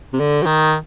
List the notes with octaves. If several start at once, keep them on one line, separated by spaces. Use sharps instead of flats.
C3
D3
F#3
D#3